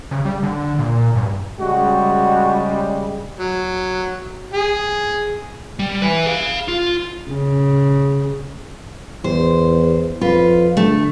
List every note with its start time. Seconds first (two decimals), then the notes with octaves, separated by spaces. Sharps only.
0.11 C#3
0.25 G3
0.43 D3
0.79 A#2
1.16 G2
1.60 C#3 G3 G#3 F#4
3.40 F#3
4.54 G#4
5.79 G3
6.02 E4 B4
6.26 G#4 F5
6.68 F4
7.30 C#3
9.24 E2 C5
10.21 F2 F4 B4
10.77 D3 A3